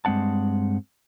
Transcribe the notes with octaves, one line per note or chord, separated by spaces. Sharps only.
G2 G#3 C4 F#5 A5